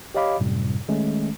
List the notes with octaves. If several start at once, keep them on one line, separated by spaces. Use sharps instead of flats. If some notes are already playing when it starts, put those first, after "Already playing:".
G4 C#5 D#5 F5 B5 D6
F#2 A2 C3 G3
D#3 G#3 A3 C#4